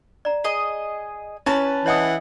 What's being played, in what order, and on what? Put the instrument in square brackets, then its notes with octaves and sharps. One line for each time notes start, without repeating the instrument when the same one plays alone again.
[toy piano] D5 A#5
[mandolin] G#4 D#5
[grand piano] C#4 [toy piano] E4 [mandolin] B4 A5
[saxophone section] E3 E5 F#5 [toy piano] C#5 D#5 D#6